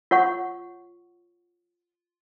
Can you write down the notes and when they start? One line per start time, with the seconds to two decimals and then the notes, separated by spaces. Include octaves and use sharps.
0.11 F4 C#5 F#5 C#6